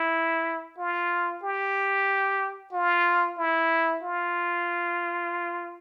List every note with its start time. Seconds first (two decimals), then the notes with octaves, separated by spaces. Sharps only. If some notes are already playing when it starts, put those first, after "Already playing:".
Already playing: E4
0.78 F4
1.43 G4
2.72 F4
3.38 E4
4.03 F4